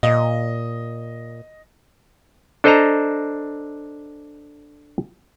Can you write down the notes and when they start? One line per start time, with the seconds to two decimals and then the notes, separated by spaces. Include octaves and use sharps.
0.03 A#2 D#5
2.64 D4 A4 C5 D#5 A5 A#5